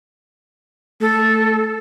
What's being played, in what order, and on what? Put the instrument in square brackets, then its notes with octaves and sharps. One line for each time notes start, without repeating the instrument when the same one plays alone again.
[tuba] A3 [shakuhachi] A4